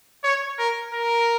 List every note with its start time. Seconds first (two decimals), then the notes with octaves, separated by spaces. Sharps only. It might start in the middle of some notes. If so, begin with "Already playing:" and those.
0.24 C#5
0.58 A#4
0.93 A#4